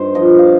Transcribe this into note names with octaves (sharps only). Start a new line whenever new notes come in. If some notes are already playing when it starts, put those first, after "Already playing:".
Already playing: G2 D#4 C5
F3 D#5
F5